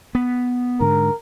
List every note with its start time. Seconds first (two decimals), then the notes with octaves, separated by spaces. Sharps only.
0.15 B3
0.80 G#2 D3 A#4